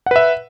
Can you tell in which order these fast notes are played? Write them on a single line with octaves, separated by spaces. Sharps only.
F#5 B4 E5